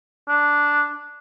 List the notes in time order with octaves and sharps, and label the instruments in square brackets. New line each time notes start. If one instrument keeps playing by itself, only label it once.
[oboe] D4